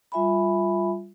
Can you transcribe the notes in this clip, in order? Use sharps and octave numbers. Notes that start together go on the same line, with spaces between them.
G3 F4 E5 G#5 B5